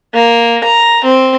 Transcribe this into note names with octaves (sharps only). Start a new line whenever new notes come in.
A#3
A#5
C4